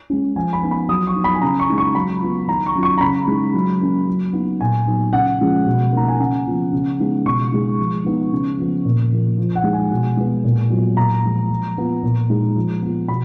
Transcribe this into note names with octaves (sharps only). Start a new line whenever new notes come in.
G#3 C#4
F3 G#5
B5
B3 D#4
B5
F#3 D#6
C#6
B3 D#4
B5
G#5
C#3 A#5
C#6
G#3 D#4
C#6
F#3 B5
B3 F4
D#3 A#5
C#6
F#3 C#4 F4
C#6
A#5
C#3 B5
G#3 D#4
F#3
A#3 C#4
F#3
B3 D#4
A#2 G#5
F#3 B3 D#4
C#3 F#5
F3 G#3 C#4 F4
B2
A#3 D#4 A#5
G#5
C#3 F#5
F3 B3 F4
C#3
G#3 B3 D#4
B2 C#6
G#3 D#4
F3
G#3 B3 D#4
C#3
F3 B3
A#2
F3 A#3
F3
F#5
G#3 D#4
G#5
B2
G#3 B3
A#2
F#3 B3 F4
A#2 A#5
F3 G#3
F3
B3 F4
A#2
G#3 D#4
F3
B3 F4
B2 B5